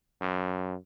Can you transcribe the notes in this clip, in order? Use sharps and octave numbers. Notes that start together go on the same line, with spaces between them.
F#2